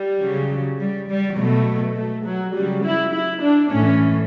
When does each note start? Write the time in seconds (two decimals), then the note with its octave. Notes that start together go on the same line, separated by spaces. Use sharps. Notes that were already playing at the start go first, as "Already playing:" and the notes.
Already playing: G3
0.21 C#3 F#3
0.79 G3
1.09 G3
1.37 B2 F#3 A3
1.97 A3
2.26 F#3
2.55 C#3 F#3 G3
2.84 E4
3.13 E4
3.42 D4
3.71 A2 E3 C#4